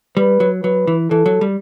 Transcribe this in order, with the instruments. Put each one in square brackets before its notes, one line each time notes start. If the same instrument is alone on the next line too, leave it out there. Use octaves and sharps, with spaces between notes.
[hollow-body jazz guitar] G3 [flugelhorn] B4
[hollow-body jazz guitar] F#3
[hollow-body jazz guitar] F#3 [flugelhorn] B4
[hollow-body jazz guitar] E3
[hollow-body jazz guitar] E3 [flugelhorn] A4
[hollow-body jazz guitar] F#3
G3